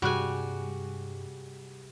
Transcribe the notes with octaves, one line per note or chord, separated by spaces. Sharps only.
G2 C3 G3 F#4 G#4 G#5 F#6